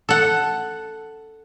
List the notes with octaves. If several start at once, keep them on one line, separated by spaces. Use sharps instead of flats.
A4 F#5